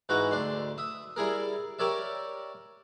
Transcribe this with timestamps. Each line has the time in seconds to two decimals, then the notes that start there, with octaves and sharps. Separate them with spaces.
0.09 G#2 E3 F#4 B4 A#5
0.31 D2 D4 C6
0.78 E5 D#6
1.16 G3 E4 G#4 A#4
1.79 G4 A#4 C#5 D5 E5